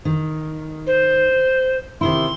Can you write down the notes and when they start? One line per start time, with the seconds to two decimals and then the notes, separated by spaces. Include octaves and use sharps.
0.05 D#3
0.87 C5
2.01 C3 D#3 E4 C6